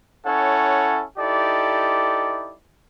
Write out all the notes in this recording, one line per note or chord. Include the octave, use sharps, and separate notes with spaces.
C#4 E4 A4 C#5 F#5
D#4 E4 G4 A4 D5